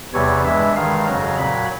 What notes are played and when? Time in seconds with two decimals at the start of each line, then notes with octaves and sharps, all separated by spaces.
0.13 E2 C3 E3 G3 C#5
0.44 G2 E3 G#3 E5
0.76 G2 D#3 G#3 F5
1.07 F2 C#3 F#3 A#5
1.38 A#2 F#3 B5